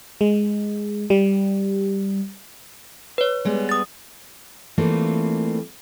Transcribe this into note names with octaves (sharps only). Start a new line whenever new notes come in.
G#3
G3
B4 C#5
G3 G#3 B3
D#6 A6
E3 G3 A3 A#3 C4 F4